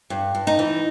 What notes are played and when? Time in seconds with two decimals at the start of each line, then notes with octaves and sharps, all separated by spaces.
0.10 G2
0.35 G2
0.47 D#4
0.59 E3